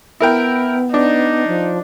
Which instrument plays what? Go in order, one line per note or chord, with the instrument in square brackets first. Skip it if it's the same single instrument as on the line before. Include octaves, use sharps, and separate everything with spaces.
[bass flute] B3 [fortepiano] E4 A#4 G5
[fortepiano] D4 [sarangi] D#4
[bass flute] F3